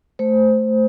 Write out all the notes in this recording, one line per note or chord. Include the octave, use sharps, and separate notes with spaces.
A3 C5
A3